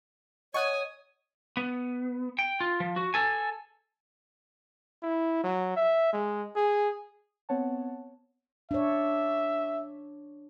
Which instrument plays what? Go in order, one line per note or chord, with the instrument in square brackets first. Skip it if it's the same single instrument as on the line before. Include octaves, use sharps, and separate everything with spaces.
[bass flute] C#5 [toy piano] D#5 F#5 [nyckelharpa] G#5 D#6 [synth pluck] C#6 F#6 G#6
[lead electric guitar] B3
G5
F4
F3
F#4
A4 G#5
[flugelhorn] E4
F#3
E5
G#3
G#4
[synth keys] B3 C4 C#5 F#5 A5
[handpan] D4 C#5 [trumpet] E5